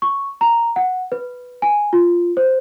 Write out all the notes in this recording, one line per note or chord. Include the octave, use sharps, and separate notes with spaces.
C#6
A#5
F#5
B4
G#5
F4
C5